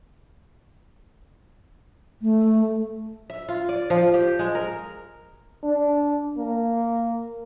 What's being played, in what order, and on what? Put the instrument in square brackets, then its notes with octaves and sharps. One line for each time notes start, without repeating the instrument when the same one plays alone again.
[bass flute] A3
[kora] E5
F4
D5
F3
G4
G#3
A#4
[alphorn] D4
A#3